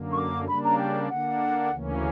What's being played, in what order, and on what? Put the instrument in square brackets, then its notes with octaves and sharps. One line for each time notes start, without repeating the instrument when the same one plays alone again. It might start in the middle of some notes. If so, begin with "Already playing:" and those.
Already playing: [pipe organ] F#2 D3 A#3
[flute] C#6
D6
[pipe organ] C#3 G3 A#3 D4 [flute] B5
[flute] A#5
G5
[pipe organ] D3 A#3 D4 [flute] F#5
[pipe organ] D2 C#3 E3 A#3 C#4